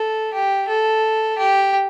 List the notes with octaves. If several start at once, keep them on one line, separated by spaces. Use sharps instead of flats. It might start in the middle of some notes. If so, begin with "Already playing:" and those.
Already playing: A4
G4
A4
G4